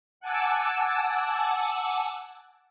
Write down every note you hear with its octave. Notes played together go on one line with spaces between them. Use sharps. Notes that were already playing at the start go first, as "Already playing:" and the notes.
F#5 G#5 A5 D6 E6